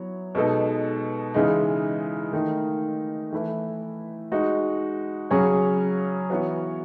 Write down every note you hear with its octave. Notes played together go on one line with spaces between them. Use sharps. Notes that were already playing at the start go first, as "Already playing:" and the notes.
Already playing: F#3 B3 E4 C#5
B2 G#3 B3 D#4 A4
C#3 E3 G#3 D#4
D#3 A3 D#4
E3 A3 E4 B4
G#3 D#4 F#4
C#3 F#3 C#4 G#4 C#5
E3 B3 F#4 C#5